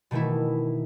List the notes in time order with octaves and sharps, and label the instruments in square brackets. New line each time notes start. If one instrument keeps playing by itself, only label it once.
[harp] B2 D#3 E3 A3 E4